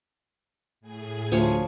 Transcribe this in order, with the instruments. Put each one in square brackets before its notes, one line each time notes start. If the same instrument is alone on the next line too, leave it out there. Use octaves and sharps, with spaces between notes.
[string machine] A2 G#4 G#5
[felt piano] D2 [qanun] F3 C#5